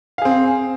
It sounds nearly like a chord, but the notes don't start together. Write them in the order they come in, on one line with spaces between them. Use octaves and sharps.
F5 G#4 C4